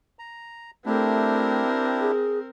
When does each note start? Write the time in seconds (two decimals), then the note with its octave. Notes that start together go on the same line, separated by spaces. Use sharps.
0.19 A#5
0.86 A3 C4 D4 E4 G4 A#4
2.01 G#4